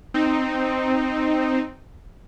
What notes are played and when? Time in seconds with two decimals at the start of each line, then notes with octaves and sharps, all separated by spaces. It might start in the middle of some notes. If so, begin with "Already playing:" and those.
0.14 C4 D#4